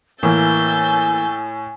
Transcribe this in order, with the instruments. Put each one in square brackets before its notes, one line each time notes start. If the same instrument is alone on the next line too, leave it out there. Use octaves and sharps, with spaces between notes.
[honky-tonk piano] A2 [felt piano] E3 A#3 [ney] G#5 [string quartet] E6 G6 A6